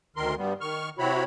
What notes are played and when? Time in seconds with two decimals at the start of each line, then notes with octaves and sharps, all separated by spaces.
0.16 D2 D#3 A#4 C6
0.37 G2 G3 B3
0.61 D#3 C#6 F6
0.99 C3 C4 E4 F#4 C#5 B5